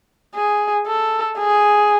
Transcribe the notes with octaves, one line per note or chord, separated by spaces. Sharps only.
G#4
A4
G#4